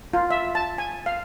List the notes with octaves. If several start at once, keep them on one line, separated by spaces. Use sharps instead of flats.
F4
E5
A5
G#5
F5